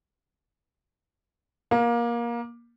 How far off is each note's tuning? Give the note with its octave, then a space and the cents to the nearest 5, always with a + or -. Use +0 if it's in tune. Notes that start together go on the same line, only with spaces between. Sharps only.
A#3 +20